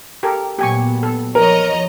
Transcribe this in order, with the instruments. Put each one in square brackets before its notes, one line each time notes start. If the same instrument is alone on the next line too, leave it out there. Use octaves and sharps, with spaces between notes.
[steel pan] G4 A4 A#4
[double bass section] A#2 F#3 B3 [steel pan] G4 G#5 C#6
[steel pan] A4
[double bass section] E2 F3 [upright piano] A#4 [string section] C#5 D#5 A#5